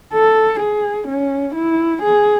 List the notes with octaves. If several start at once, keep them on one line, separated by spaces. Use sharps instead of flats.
A4
G#4
C#4
E4
G#4